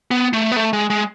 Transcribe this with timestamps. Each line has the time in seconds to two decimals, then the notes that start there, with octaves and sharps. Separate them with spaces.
0.11 B3
0.33 A3
0.52 B3
0.56 A3
0.73 G#3
0.90 G#3